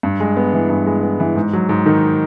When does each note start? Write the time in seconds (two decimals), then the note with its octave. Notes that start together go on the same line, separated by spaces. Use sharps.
0.03 G2
0.20 G#3
0.37 B3
0.53 E3
0.70 G2
0.86 G#3
1.03 B3
1.20 E3
1.36 G#2
1.53 F#3
1.69 G#2
1.86 D#3